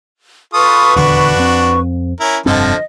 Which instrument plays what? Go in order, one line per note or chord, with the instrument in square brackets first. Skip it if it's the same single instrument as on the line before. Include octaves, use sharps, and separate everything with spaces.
[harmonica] F4 A4 D#6 [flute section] B4 C#6
[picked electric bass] D#1 E2 D3 [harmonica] D4 F#4
[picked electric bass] F2 C4
[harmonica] C#4 E4 A#4
[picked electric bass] F1 G2 C4 [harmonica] D3 F3 A4 [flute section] D#5